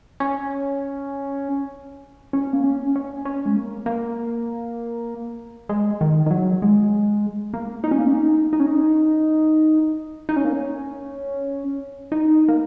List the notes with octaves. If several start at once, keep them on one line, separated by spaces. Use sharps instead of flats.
C#4
C#4
A#3
C#4
C#4
C#4
G#3
A#3
A#3
G#3
D#3
D#3
F#3
G#3
A#3
D#4
C#4
A#3
C#4
D#4
D#4
C#4
D#4
D#4
C#4
A#3
C#4
D#4
A#3